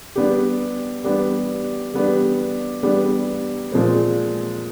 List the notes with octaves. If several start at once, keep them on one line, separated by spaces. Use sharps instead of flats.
G3 B3 D4 G4
G3 B3 D4 G4
G3 B3 D4 G4
G3 B3 D4 G4
A#2 F3 G#3 C4